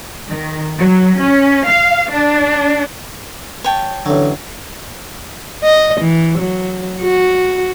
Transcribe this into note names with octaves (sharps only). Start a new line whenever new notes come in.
D#3
F#3
C#4
F5
D4
C#5 G5 A5
A1 D3 F#3
D#5
E3
F#3
F#4